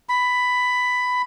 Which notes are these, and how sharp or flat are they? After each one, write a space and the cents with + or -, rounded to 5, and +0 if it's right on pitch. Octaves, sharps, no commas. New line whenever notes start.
B5 +10